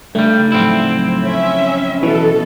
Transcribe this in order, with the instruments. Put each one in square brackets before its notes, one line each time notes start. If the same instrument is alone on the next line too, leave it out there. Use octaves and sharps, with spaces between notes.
[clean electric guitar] G2 G3 [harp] C#3 D#4 E4 [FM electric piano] A3
[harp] A2 F3 F#3 [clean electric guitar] C4 E4
[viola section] C#4 E5 [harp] G#6
[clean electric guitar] B2 [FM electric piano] E3 [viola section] A4